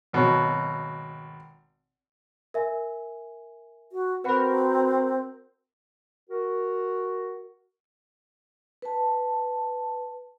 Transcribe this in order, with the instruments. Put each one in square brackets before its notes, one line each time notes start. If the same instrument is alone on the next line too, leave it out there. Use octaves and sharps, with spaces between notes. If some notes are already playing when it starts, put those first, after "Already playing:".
[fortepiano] G#1 B2 F#3
[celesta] A#4 E5 G#5
[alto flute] F#4
[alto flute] C4 [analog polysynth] F#4 A#4 [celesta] B4 F#5 B5
[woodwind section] F#4 A#4
[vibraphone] B4 A5